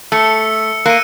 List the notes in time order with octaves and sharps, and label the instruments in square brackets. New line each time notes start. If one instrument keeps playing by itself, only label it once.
[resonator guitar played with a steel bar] A3 [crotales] E6 C#7
[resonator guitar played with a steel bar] A#3 [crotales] F#6 C#7 D#7